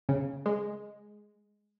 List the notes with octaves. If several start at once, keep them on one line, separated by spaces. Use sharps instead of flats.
C#3
G#3